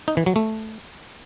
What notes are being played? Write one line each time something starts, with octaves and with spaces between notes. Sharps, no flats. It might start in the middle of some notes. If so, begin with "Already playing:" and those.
D#4
E3
F#3
A3